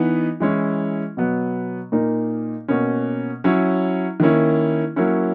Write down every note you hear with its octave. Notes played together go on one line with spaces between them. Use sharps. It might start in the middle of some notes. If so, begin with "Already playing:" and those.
Already playing: E3 B3 D#4
E3 G#3 C#4 E4
B2 F#3 B3
A#2 A#3 D#4
B2 A#3 C#4
F#3 C#4 E4
D#3 A#3 C#4 E4
F#3 A#3 C#4 E4